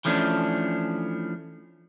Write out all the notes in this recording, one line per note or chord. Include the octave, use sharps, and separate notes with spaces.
E3 F3 A3 C#4 D4